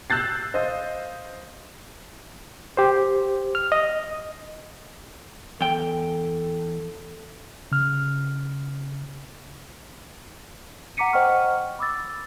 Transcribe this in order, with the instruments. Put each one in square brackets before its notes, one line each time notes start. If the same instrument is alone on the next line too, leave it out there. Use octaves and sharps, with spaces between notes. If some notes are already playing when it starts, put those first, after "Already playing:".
[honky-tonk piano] E6 F#6 G6 A6 C7
C5 D#5 F5
[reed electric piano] G4 C5
F6
D#5
[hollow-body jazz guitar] E2 G5 [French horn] A4
[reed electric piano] C#3 F6
[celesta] F#5 A#5 D6 B6 C#7 D#7
C5 D#5 F#5 G5 C#6 F6
B5 D6 E6 A6